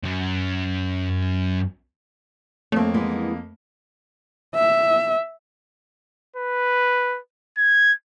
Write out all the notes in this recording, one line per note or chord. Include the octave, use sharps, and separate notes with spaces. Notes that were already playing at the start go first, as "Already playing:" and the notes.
F#2 F#3
F2 A3 A#3 C4 C#5
E3 G#3 B3
E5
B4
G#6